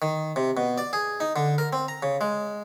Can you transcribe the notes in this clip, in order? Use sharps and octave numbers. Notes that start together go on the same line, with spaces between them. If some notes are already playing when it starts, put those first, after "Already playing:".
D#3
C3
B2
D5
G#4
D#4
D3
A#4
C4
A#5
C#3
G#3